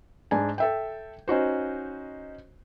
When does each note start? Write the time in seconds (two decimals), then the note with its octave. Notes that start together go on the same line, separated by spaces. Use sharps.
0.31 G#2 D4 G#5
0.58 A4 E5 G5
1.28 C#4 D#4 F#4 C5